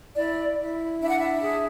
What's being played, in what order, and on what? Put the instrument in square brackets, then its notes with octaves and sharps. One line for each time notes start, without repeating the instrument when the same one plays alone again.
[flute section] E4 D5
E4
D4 E5
F#5
E5
G#4